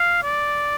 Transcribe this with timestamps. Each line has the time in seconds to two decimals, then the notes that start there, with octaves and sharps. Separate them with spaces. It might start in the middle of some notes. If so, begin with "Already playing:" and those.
Already playing: F5
0.23 D5